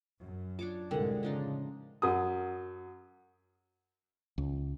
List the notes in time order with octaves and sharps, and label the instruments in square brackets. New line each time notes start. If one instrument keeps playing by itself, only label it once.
[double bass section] F#2
[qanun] D4 C#5 D6 [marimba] F4
[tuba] C2 [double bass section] A2 G#3 [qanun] D3 F#5 [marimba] A4 A#4 G5
[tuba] C#3 [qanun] F3 D4 D#4
[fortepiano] F#2 D#6
[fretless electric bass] C#2